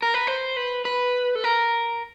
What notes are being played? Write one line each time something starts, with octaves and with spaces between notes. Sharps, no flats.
A#4
B4
C5
B4
B4
A4
A#4